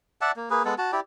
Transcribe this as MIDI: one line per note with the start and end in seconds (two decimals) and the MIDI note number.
0.21 0.32 74
0.21 0.32 76
0.21 0.32 78
0.21 0.32 81
0.36 0.49 58
0.50 0.63 58
0.50 0.63 68
0.50 0.63 71
0.65 0.75 56
0.65 0.75 59
0.65 0.75 69
0.78 0.91 66
0.78 0.91 81
0.92 1.00 64
0.92 1.00 67
0.92 1.00 74